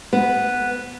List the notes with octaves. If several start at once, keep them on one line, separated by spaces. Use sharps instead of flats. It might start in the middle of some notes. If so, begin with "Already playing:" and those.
B3